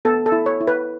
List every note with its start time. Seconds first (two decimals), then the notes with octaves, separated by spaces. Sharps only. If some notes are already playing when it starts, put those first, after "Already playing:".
0.05 B3 A4
0.26 A4
0.32 E4
0.46 C#5
0.60 E4
0.67 B4